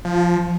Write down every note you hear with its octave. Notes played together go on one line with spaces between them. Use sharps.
F3